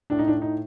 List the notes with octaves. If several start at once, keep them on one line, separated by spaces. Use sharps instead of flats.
A2 D4
D#4
D4
D#4